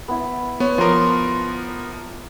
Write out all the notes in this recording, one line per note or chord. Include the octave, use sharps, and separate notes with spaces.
B3 E4
B3 C#5
F3 B3 A#4 C6 D6